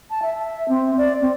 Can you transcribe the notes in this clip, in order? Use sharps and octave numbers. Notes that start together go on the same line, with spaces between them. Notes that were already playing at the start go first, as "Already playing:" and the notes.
A5
E5
C4
D5
C4